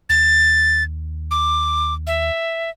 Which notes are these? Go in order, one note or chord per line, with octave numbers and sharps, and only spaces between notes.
D#2 A6
D6
E5